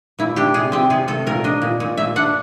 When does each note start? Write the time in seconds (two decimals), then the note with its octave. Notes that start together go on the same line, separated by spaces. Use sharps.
0.19 A#2 E4
0.36 D4 G4
0.54 C3 G#4
0.72 C4 G4
0.90 C3 G#4
1.08 C3 A4
1.27 A#2 A#4
1.44 D4 D#5
1.62 A#2
1.80 A#2
1.97 A#2 E5
2.16 D4 F#5